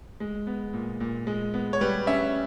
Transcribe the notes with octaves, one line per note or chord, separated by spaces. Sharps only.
G#3
B3
A#2
A#2
G#3
B3
C#5
G3 B4
C#4 E5